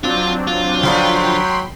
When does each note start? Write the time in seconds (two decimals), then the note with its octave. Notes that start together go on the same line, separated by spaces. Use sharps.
0.04 F#3 C4 D4 F4
0.47 F4
0.83 D3 F3 F#3 D4 G5 B5 C6